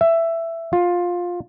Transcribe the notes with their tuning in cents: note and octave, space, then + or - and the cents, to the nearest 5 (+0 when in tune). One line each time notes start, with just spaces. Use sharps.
E5 +10
F4 +15